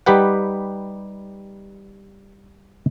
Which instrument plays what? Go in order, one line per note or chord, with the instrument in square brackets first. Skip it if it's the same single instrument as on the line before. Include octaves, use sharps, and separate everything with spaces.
[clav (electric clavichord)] G3 D#4 G4 B4 F#5